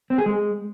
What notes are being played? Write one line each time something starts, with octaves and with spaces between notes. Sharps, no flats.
C4
G#4
G#3